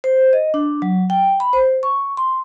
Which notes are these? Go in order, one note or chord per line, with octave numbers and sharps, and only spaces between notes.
C5
D#5
D4
F#3
G5
B5
C5
C#6
C6